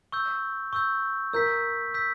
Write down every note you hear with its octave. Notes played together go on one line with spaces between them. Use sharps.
C#6 E6 G6
C#6 E6 G6
A#4 E6 G6 B6
E6 G6 B6